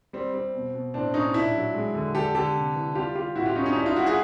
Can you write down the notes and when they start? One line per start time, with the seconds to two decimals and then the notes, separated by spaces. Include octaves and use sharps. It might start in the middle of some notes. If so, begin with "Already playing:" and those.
0.13 G3 C4
0.34 G3 C4
0.54 B2
0.74 B2
0.94 A2 C4 D4
1.14 A2 C#4 D#4
1.34 A#2 D4 E4
1.54 F#3
1.74 G#3
1.95 D3
2.15 D3 G4 A4
2.35 D3 G4 A4
2.55 C3
2.75 E3
2.95 G3 F4 G4
3.15 G3 F4 G4
3.35 A2 E4 F#4
3.46 F4 G4
3.56 E3 C#4 D#4
3.66 C#4 D#4
3.76 G3 D4 E4
3.86 D#4 F4
3.96 G3 E4 F#4
4.06 F#4 G#4